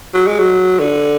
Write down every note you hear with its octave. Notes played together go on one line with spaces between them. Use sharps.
F#3
G#3
F#3
D3